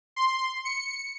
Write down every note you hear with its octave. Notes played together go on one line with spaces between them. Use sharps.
C6
C#7